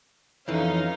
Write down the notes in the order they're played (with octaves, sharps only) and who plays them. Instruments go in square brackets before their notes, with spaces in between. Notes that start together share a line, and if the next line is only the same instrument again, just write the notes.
[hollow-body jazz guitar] F2 E3 [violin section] C#4 D#4 F5